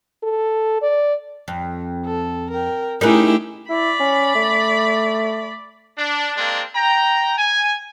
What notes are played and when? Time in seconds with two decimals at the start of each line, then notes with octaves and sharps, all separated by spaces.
0.23 A4
0.82 D5
1.48 F2
2.05 A4
2.50 A#4 G5
3.01 A3 C#4 D#4 E4 G4 G#4 A#4 B4
3.69 E4 D5 B5
4.00 C#4
4.35 A3
5.98 D4
6.37 G#3 A#3 C4 D4
6.75 G5 A#5
7.38 G#5